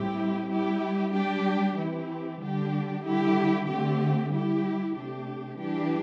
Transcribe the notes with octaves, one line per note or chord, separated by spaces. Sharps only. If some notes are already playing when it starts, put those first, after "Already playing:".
Already playing: A2 G3 C4 E4 G4
G3 E4 G4
G3 D4 G4
E3 C4 E4 G4
D3 G3 D4 G4
D3 G3 E4 G4
D3 A3 C4 G4
G3 E4 G4
C3 A3 D4 G4
E3 G3 D4 G4